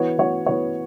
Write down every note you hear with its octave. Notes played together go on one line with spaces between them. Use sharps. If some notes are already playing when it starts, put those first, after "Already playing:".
Already playing: E3 B3 F#4 C#5
E3 B3 F#4 C#5
E3 B3 F#4 C#5